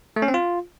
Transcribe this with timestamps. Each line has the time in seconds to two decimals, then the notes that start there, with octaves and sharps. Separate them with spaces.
0.16 A3
0.22 C#4
0.28 C4
0.34 F4